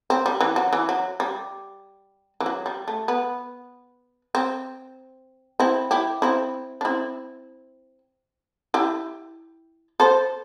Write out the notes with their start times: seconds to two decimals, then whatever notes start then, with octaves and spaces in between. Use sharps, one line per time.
0.10 C4
0.26 G3
0.41 E3
0.56 F#3
0.73 E3
0.89 F#3
1.20 G3
2.40 E3
2.46 F#3
2.66 G3
2.88 A3
3.08 B3
4.35 C4
5.60 C4 E4
5.91 E4 G4
6.22 C4 E4
6.81 D4
6.85 C4 E4
8.74 E4 G4
10.00 A4 C5